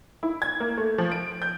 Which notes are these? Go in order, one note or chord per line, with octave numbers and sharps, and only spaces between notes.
E4
G#6
A#3
A3
F3
D7
G6